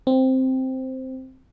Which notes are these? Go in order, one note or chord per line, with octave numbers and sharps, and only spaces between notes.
C4